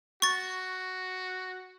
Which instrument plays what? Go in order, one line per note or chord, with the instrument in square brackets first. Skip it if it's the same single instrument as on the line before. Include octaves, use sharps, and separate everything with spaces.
[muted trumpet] F#4 [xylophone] C#6 A6